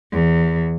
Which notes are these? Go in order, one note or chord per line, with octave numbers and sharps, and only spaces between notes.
E2